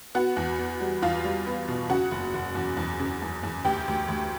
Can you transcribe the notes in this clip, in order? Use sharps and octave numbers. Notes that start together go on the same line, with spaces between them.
B3 F#4 F#5
E2
B3
G3
E2 F4 F5
G3
B3
B2
C#3 F#4 F#5
F#1
F#1
E2
E2
C#3
E2
E2
D2 G4 G5
D2
D2